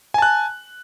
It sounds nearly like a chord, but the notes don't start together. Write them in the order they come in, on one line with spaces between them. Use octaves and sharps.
G#5 A5 F#6